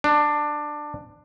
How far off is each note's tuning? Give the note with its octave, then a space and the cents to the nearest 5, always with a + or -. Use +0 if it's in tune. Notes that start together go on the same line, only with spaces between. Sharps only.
D4 +15